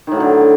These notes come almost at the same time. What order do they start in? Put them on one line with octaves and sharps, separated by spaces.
D#3 A2 F#3 D3